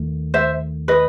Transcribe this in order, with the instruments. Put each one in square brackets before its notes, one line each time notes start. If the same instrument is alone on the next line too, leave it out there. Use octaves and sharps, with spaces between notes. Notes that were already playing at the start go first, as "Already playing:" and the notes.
Already playing: [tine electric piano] D#2 D#3 A3
[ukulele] C5 E5
B4 D#5